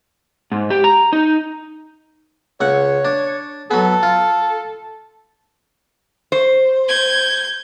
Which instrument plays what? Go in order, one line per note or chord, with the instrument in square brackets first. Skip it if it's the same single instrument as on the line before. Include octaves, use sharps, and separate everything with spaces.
[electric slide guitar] G#2
G4
A#5
D#4
[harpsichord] C#2 F#5 [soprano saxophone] C#5
[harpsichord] D4
[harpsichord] F#3 B3 [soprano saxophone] A4
[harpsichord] F4
[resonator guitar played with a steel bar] C5
[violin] G6 G#6